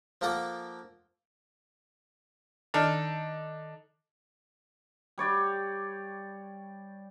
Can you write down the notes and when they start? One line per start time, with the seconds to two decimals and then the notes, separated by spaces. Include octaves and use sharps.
0.21 F3 A#3 A4 F#5 D6
2.74 D#3 D4 D#4 A4 F6
5.18 G3 C#5 D5 G5